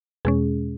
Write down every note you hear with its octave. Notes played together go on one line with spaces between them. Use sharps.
E2 B2 G#3 C#4 G#4